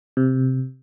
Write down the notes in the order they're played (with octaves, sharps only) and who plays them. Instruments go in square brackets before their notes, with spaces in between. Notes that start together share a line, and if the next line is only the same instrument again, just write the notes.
[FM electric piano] C3